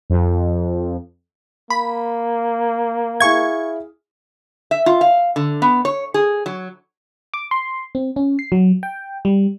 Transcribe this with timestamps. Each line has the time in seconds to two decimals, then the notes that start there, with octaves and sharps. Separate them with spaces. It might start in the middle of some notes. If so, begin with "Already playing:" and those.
0.10 F2
1.70 A#3 B5
3.20 E4 G#4 F5 C#6 G#6
4.71 E5
4.86 F4
5.01 F5
5.36 D3
5.62 B3
5.85 C#5
6.14 G#4
6.46 F#3
7.34 D6
7.51 C6
7.95 C4
8.16 C#4
8.39 C7
8.52 F#3
8.83 G5
9.25 G3